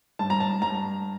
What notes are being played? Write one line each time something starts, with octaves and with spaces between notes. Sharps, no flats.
G2 A5
A#5
A5
G2 A#5